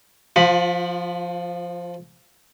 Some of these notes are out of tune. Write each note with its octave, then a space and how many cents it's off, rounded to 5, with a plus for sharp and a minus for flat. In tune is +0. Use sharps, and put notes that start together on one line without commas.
F3 +0 F4 +35 B5 +0